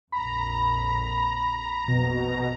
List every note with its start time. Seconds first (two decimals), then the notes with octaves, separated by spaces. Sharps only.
0.12 A#1 F2 A#5 B5
1.88 A#1 F2 B2 A#6